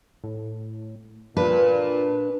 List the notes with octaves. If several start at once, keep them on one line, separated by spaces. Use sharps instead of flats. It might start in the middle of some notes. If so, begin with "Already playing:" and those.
A2
A#2 D4 B4